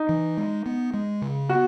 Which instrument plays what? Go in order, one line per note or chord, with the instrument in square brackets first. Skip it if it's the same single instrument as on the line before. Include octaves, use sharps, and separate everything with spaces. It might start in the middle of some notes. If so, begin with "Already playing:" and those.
Already playing: [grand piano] D#4
[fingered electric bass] E3
G#3
B3
G#3
C#3
[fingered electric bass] B3 [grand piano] F#4